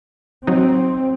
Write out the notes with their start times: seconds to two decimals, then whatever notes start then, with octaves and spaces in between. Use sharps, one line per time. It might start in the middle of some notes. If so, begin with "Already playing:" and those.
0.47 F#3 C4 D#4